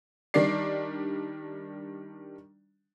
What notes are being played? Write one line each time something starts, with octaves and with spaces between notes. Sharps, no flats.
D#3 G3 D4 D5 C7